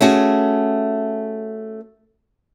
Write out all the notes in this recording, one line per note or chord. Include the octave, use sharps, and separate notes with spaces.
A3 C#4 F#4 G#4